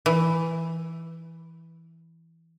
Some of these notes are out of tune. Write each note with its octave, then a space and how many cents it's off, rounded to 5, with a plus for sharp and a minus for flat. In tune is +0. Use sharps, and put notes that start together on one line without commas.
E3 +0